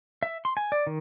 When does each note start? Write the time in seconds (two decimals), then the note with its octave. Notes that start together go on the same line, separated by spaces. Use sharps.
0.23 E5
0.45 C6
0.57 G#5
0.72 D5
0.87 D#3